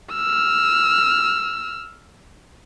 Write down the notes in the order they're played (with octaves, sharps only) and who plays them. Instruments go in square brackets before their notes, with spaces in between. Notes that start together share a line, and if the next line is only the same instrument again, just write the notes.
[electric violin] E6 F6